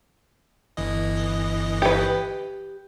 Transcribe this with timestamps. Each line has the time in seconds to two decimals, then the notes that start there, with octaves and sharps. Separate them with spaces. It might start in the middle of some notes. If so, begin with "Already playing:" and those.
0.77 G1 E3 D#5
1.82 G4 B4